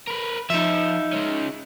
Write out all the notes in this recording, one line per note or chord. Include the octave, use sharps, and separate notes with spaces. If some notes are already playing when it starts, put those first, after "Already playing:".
A#4 B4
F3 D#4 E5
G#3 C#4